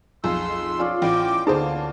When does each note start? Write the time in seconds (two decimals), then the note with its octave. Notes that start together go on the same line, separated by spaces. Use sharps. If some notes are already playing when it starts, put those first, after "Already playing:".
0.24 B1 F2 F4 G#4 C6 E6
0.79 C#4 F4 D5
1.02 A1 B3 G5 D6
1.47 D2 A#3 B3 D#4 G#4 C5 F5 A5